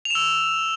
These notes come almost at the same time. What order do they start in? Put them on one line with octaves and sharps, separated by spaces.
F7 E7 E6